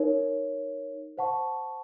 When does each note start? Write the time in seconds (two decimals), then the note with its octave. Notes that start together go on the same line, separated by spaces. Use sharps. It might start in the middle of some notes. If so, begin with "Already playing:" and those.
Already playing: D#4 A#4 C#5
1.18 C5 F#5 A5 C#6